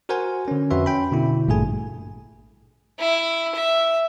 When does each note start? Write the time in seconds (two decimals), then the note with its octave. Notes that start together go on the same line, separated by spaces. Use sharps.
0.09 F#4 A#4 C5 F#5 G#5
0.48 D3 C#4
0.70 F2 C#4 F#4 B4 E5 C6
0.86 C#4 G5 B5
1.12 B2 D3 E4
1.48 A1 G2 A#2 A3 G#4 G#5
2.99 E4
3.55 E5